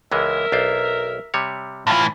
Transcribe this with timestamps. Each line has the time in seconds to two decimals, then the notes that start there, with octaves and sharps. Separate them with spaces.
0.12 C#2 E3 G#3 A#4 E5
0.52 B1 D4 C5
1.34 C3 G3 C#5
1.87 A2 E3 F4